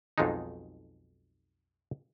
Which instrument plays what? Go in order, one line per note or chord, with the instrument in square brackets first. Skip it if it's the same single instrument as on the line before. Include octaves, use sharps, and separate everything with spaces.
[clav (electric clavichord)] B1 F2 F#3 G#3 D#4